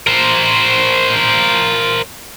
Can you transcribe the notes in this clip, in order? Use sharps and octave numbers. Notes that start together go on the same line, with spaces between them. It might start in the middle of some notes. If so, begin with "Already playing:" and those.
A#4 C5